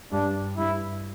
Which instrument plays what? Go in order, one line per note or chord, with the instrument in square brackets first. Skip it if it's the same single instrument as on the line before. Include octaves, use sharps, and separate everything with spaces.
[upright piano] G2 [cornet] D4
[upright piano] G2 [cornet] E4